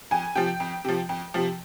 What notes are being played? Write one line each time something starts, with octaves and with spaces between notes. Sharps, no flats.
F2 G#5
C3 F3 G5
F2
C3 F3
F2
C3 F3